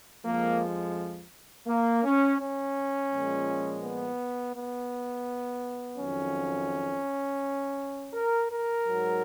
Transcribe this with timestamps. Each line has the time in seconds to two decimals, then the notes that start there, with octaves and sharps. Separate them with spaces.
0.24 F2 F3 G#3 A#3
1.67 A#3
2.04 C#4
2.40 C#4
3.12 A#2 F3 G#3
3.83 B3
4.55 B3
5.98 F2 D#3 F#3 C#4
8.13 A#4
8.50 A#4
8.85 G#2 F#3